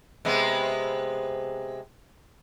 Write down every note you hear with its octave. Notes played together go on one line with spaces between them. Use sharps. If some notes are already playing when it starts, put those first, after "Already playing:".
C3 G#3 B3